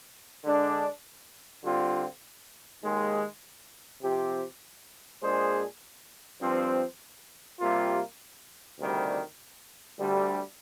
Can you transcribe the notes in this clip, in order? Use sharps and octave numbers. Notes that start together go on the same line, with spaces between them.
D3 G#3 D4
D3 G3 C4 F4
D#2 D#3 G#3
C3 F3 C4 G4
A#2 G#3 D4 G#4 C5
G2 F3 C4
C3 G3 A#3 F4
D2 C3 D#3 G3
D2 D3 G3